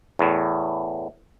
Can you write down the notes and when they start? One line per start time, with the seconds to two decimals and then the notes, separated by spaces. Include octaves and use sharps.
0.19 E2 A2